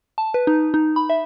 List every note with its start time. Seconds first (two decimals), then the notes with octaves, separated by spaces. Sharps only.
0.18 A5
0.34 B4
0.47 D#4
0.74 D#4
0.96 B5
1.10 E5